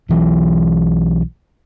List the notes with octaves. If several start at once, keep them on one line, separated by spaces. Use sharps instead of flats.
B1 E3 F#3